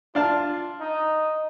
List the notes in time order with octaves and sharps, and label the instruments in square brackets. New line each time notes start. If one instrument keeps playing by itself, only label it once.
[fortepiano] D4 F5 A5 [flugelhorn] F4
[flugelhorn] D#4